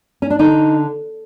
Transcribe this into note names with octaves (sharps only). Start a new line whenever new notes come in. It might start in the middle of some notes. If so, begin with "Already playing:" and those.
C#4
D4
D3 D#4